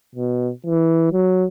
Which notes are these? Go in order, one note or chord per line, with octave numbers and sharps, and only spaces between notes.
B2
E3
F#3